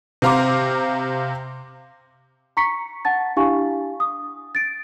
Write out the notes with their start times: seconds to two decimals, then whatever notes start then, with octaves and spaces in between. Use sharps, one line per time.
0.22 C3 C4 F5 A#5 C6 D6
2.57 A#5 C#6 B6 C#7
3.05 F#5 A5 A6
3.36 D4 E4 G4 F5 G#5 C#6
4.00 D#6
4.55 A6 D7